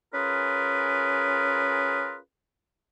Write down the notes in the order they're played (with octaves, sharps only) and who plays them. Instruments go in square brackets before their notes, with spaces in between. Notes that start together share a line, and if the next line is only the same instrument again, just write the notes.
[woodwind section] C#4 F4 G#4 A#4 B4